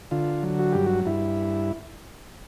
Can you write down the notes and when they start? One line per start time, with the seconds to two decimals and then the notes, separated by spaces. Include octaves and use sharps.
0.11 D3 F4
0.43 F#3
0.59 F#4
0.72 G2 G4
0.86 F#4
1.06 G2 E4